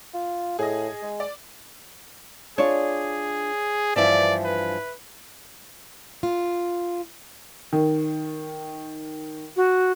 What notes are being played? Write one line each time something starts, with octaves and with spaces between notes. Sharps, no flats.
F4
A2 G#4 D#5
G#3
D5
D4 F4 G#4 C#5 D5
G2 E3 F3 D5 E5
B4
F4
D#3
F#4